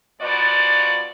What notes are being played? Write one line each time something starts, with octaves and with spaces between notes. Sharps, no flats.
D#2 F3 B3 F#4 D5